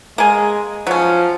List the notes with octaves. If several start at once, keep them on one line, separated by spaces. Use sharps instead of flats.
G#3 A#3 G#5
F3 F#3 C#4